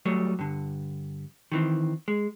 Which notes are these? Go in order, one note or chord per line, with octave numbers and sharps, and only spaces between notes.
F#3 G3 A3
G2 D3
D#3 E3 C4
G#3